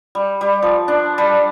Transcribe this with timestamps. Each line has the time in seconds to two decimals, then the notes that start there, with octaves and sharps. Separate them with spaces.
0.15 G3
0.41 G3
0.62 F3
0.88 D4
1.18 G3